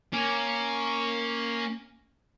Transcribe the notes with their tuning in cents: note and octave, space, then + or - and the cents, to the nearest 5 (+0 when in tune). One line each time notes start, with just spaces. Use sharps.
A#3 +0 C#4 +0